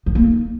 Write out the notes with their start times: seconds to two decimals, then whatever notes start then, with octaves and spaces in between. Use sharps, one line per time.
0.06 F3
0.15 A#3
0.24 D#4